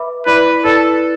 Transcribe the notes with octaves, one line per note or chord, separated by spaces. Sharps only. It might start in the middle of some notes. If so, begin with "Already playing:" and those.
Already playing: B4 E5 B5 D6
E4 B4 D5 B5 D6
E4 A4 B4 D5